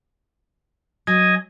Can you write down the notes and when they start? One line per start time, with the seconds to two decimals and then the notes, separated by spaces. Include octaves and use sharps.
1.07 F#3 D#5 G#5